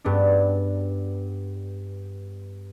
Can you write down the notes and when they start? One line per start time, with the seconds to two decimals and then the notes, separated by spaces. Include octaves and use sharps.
0.04 G2 B3 D4